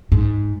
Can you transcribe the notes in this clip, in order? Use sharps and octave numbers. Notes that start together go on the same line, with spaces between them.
G#2